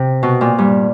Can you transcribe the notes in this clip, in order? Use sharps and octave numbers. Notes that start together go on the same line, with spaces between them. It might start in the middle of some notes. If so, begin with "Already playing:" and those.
Already playing: C3
B2
A#2
G2